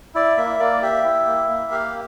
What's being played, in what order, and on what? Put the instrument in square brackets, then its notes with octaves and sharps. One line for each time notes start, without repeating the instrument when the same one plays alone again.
[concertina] E4 D5
A#3 E5
A#3 D5
G4 E5
E4
A#3
A#3
G4 F5